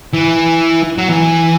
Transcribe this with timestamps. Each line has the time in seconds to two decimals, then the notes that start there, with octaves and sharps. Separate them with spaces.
0.14 E3
0.98 F#3
1.09 E3